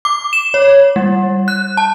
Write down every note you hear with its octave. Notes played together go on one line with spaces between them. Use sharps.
D6
E7
C#5
G3
F#6
A5